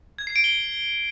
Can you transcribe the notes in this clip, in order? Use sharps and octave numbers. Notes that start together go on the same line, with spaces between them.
G#6
C7
D7
G7